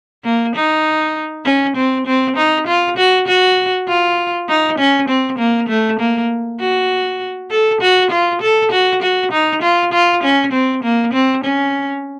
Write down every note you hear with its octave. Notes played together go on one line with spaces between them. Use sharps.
A#3
D#4
C#4
C4
C4
D#4
F4
F#4
F#4
F4
D#4
C#4
C4
A#3
A3
A#3
F#4
A4
F#4
F4
A4
F#4
F#4
D#4
F4
F4
C#4
C4
A#3
C4
C#4